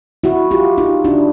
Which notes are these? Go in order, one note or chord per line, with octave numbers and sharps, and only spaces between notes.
E4 F#4
F4 G4
D#4 F4
D4 E4